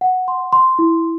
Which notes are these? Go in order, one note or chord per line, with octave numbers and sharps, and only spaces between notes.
F#5
C6
C6
E4